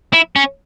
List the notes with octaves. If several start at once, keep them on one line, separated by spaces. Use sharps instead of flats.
E4
C#4